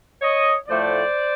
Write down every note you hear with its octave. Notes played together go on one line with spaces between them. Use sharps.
C#5 D#5
A2 F3 A3 C5 D5